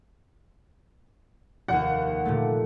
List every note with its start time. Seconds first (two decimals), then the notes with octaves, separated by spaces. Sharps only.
1.68 F1 D#2 F#5
2.25 A#2 D3 A3